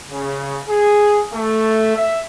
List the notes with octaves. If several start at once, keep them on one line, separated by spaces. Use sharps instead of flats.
C#3
G#4
A3
E5